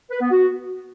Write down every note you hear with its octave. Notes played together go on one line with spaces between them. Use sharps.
B4
B3
F#4